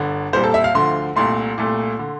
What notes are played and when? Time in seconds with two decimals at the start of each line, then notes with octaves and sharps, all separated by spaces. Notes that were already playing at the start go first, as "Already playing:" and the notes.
Already playing: G1 D3
0.33 C2 A#2 G3 C5
0.44 A4
0.54 E5
0.64 F5
0.75 D2 D3 F3 C6
1.16 C2 A#2 A3 C6
1.58 C2 A#2 A3
1.99 D3